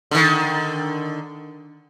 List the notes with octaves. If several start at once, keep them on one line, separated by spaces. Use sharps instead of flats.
D3 D#3